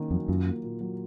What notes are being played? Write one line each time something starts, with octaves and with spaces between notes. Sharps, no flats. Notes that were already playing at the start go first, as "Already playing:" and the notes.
Already playing: D#3 A#3 C#4
F2 F#3
F#2 F4
A#3
A#2
F#3